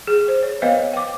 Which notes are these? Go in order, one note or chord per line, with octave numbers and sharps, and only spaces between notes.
G#4
C5
C#5
B3 B4 C#5 D#5 F5
G5 D6